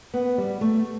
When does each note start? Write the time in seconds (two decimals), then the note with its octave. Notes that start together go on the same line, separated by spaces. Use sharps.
0.14 B3
0.38 G3
0.61 A3